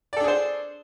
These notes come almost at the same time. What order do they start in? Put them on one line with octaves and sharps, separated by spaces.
D5 A4 D4 G#4 C5